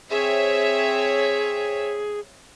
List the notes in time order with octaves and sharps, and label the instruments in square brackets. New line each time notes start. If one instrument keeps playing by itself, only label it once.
[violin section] C4 C#5 E5 [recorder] G#4